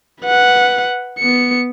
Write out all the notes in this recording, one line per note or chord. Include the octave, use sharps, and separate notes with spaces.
B4 F#5
B3 C#7